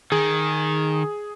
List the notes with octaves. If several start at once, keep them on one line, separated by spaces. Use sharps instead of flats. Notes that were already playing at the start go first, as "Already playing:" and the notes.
D#3 G#4